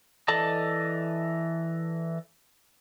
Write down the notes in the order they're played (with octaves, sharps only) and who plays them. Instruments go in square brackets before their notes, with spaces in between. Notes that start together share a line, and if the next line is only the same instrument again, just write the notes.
[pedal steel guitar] E3 A4 D5 D#5 A5